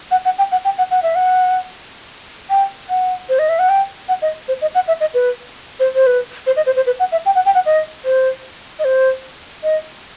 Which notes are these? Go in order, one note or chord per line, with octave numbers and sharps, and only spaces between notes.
F#5
F#5
G5
F#5
G5
F#5
F#5
E5
F#5
G5
F#5
C5
D#5
E5
F#5
G5
F#5
D#5
C5
D#5
F#5
E5
D#5
B4
C5
C5
B4
C5
D#5
C5
C5
B4
F#5
E5
G5
F#5
G5
F#5
D#5
C5
D#5
C5
D#5